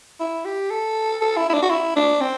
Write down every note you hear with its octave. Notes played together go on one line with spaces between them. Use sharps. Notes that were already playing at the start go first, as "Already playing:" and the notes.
E4
G4
A4
A4
E4
E4
D4
F#4
E4
D4
C4